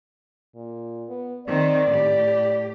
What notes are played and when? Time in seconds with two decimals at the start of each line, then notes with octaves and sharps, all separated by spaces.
0.55 A#2
1.09 B3
1.47 D#3 C4 D5
1.91 A2 G4